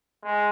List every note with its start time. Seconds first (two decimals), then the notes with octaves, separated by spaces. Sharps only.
0.24 G#3